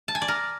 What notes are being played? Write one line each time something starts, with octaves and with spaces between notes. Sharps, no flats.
A5
G#5
D5
A#4